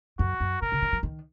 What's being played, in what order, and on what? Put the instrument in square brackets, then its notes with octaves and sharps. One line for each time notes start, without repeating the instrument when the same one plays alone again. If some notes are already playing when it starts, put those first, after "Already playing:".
[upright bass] F#2 [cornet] F#4
[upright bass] F#2
[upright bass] B2 [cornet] A#4
[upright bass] C#3
D#3
F3
D#3